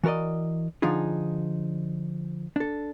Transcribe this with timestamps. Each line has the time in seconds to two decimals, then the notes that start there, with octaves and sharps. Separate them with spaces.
0.03 E3 F#4 A#4 D5 D#5
0.82 D3 F3 D4 D#4 F4 G#4
2.56 D4 A4